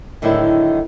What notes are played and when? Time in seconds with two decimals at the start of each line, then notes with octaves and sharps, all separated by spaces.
0.22 A2 D3 D#3 F#3 G#3 E4